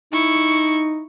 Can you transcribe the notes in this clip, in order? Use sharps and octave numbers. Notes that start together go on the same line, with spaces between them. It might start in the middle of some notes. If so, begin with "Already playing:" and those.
D#4 E4 C#6